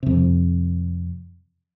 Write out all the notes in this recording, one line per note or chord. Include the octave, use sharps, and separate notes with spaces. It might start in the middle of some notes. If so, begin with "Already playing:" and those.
F2 C3